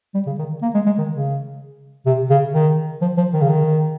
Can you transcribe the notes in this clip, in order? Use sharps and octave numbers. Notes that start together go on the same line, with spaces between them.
G3
C#3
D#3
A#3
G#3
G#3
D#3
C#3
C3
C#3
D#3
F3
F3
D#3
C#3
D#3